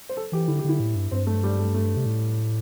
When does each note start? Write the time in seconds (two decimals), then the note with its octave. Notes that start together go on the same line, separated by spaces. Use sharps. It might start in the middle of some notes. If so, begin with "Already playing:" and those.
0.09 C5
0.17 A4
0.32 E3 G4
0.48 D3 E4
0.59 G4
0.64 D3 E4
0.80 A2
0.95 G2
1.11 G2 C4
1.27 A3
1.43 G3
1.59 A3
1.74 A3
1.97 C3
2.06 A2